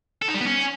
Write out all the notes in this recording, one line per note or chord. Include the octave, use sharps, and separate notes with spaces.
A4
D#4
G3
B3
C#4